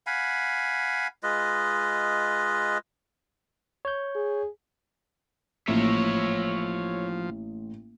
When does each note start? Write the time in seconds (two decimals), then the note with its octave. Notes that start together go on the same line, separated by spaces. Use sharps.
0.07 F5 F#5 G#5 B5
1.23 G#3 F4 B4 D#5
3.85 C#5 G6
4.15 G#4
5.68 A1 F3 A#3 C#5 E5